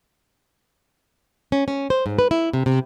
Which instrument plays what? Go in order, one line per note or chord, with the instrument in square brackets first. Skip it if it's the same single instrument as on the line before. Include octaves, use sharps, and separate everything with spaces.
[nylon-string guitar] C#4
C#4
C5
G#2
B4
E4
C3
C3